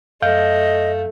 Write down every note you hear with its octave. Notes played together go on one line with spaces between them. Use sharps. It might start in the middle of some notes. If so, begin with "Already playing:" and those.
F#2 A3 D#5 F5 G6